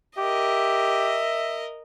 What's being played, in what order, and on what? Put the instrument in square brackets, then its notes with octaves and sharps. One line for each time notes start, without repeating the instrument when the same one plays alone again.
[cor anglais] G4 [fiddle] A#4 D#5 [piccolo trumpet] E5